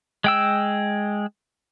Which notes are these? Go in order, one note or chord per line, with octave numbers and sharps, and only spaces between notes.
G#3 G5 E6